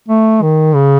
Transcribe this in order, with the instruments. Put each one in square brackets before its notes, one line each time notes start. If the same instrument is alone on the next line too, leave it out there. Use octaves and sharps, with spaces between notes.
[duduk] A3
D#3
C#3